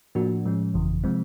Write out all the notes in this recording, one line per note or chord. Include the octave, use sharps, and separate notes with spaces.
A2 F3 A#3 D4 F#4
A2 F3 G#3 C#4
G1 F2 C#3 E3
C3 F3 G#3 C4